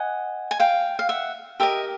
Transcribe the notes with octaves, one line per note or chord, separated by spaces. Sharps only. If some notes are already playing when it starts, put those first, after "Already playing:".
Already playing: D#5 F#5 G#5
G#5
F5 G5
F5
E5 F#5
G4 A#4 D#5 E5